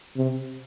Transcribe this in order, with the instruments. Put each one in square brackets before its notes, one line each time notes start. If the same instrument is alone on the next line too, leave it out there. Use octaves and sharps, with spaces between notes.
[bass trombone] C3